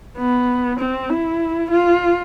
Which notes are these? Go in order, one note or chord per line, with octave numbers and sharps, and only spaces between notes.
B3
C4
E4
F4